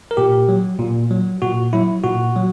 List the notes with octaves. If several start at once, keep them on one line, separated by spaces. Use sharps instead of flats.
A#4
A#2 G4
F#3
A#2
F#3
A#2 F#4
F#3 E4
A#2 F#4
F#3